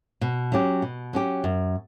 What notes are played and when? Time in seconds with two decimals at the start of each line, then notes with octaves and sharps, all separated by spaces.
0.21 B2
0.52 F#3 C#4 G4
0.82 B2
1.13 F#3 C#4 G4
1.44 F#2